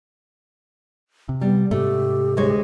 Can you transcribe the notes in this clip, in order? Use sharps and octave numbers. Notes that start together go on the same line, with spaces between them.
C3
G3 B3
G#2 C3 A3 G4
D2 G#3 C#5